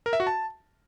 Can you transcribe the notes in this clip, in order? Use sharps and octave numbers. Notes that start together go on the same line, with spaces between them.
A#4
E5
F#4
A5